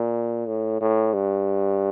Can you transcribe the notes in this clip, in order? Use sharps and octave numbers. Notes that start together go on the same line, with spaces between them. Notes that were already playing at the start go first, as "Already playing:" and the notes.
Already playing: A#2
A2
A2
G2